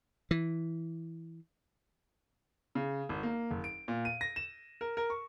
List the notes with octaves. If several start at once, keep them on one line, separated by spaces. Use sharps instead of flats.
E3
C#3
G#1
A#3
F#1
D7
A#2
D#7
A#6
E7
A#4
A#4
C#6